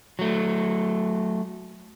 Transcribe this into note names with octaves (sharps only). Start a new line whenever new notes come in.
F#3 A3